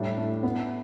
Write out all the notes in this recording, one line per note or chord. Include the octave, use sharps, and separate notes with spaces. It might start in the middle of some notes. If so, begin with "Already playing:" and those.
Already playing: A2 G3 D4
A3
B3